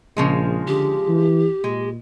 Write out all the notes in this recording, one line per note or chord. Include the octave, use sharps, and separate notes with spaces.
A#1 C#3 F3 G#3
D3 G4
E3
A#2 G#3